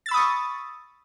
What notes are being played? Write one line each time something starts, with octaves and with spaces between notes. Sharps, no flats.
B5 C#6 D#6 E6 A6